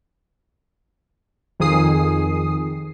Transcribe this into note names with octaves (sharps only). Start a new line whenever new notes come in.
F2 D#3 G#4 D#6 C7